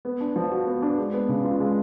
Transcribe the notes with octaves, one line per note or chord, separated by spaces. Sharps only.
B3
D4
F3
F#4
B3
D4
G#3
B3
C#3
F4
G#3